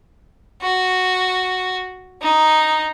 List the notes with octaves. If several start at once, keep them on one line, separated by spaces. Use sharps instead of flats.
F#4
D#4